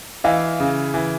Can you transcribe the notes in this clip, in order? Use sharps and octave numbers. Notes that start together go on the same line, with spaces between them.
E3 D#5 F5
C#3
E3